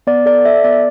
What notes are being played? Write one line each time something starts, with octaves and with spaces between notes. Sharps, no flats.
B3 D5
A4 D5
A4 E5
B3 D5